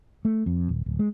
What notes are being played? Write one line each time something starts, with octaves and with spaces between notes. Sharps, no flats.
A3
F2
D#1
D1
G#3